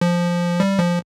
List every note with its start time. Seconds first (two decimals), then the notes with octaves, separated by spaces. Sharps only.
0.01 F3
0.60 G3
0.79 F3